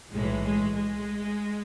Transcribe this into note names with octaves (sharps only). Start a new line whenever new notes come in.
B1 A2 E3 G#3
G#3
G#3